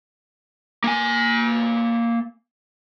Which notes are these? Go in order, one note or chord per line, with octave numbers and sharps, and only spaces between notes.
A#3 G#5